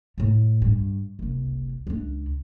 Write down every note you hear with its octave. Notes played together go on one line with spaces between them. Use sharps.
A2 A3
G2
F#1 C2
C#2 D4